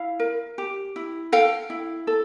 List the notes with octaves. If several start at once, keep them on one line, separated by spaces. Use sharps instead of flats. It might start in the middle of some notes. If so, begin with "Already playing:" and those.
Already playing: E4 F5
A#4
G4
E4
A4 F5 G5
E4
A4